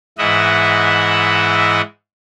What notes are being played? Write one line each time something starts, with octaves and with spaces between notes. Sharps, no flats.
G#2 E3 E4 D#5 E5 F#5